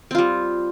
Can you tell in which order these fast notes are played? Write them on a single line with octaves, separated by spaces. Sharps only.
C4 F4 G3